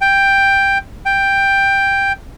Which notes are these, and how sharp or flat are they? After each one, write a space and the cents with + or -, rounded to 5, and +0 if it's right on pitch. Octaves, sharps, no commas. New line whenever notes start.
G5 +5
G5 +5